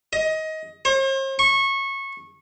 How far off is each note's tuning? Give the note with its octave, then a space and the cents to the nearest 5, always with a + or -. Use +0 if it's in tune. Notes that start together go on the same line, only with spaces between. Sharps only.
D#5 +20
C5 +45
C#6 -20